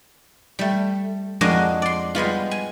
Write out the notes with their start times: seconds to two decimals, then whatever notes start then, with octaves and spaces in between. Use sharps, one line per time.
0.59 G3 A3
1.41 F2 G#3 D4 F#4 A#4 D#5
1.82 D5 C6
2.15 G3 G#3 B3 F4
2.51 G#5